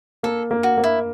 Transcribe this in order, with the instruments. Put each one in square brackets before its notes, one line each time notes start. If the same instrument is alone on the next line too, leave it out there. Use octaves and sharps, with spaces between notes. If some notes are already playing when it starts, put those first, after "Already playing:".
[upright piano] A#3 [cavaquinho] A4
[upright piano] A#3
[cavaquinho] F#4
[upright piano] A#3
[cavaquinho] E4